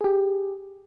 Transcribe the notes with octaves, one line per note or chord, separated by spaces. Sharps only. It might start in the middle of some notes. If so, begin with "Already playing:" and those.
G4 G#4